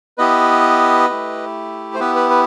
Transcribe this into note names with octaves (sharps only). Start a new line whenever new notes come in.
B3 E4 G4 B4 D#5
A3 E4 G4
C5
B3 E4 G4 B4
B4
B4